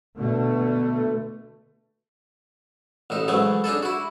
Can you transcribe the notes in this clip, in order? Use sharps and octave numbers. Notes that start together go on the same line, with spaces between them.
B2 D3 A3
A1 A2 D#4
G#2 E3 F#3 A3 G#4
D4 D#4 G#4 A4
E4 F#4